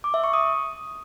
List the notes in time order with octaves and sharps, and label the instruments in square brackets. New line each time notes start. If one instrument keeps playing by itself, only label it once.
[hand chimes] D6
E5
C#6
D#6